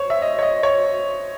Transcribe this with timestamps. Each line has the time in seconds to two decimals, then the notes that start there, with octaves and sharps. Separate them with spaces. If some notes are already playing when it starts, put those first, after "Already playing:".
Already playing: C5 C#5
0.10 E5
0.22 D#5
0.39 C#5
0.42 D#5
0.63 C#5